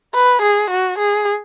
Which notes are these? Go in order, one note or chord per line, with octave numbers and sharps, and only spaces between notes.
B4
G#4
F#4
G#4